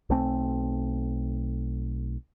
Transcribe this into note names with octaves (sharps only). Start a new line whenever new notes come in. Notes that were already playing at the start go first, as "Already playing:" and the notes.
B1 A3 C4